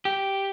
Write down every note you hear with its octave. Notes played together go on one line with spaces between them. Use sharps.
G4